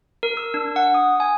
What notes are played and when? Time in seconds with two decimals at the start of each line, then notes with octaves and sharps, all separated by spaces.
0.23 A#4
0.37 E6
0.54 D4
0.76 F#5
0.94 D#6
1.20 G#5